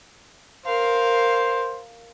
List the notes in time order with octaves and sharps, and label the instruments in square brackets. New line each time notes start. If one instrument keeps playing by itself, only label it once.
[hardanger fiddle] A#4 F5 [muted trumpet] C5